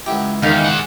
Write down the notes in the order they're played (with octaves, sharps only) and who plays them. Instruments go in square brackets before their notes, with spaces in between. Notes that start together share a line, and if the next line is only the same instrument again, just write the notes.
[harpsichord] C#2 F#3 E4 [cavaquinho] G4
[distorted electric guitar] E2 [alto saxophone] D#3 [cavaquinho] D#4 F5
[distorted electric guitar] G#4 F#5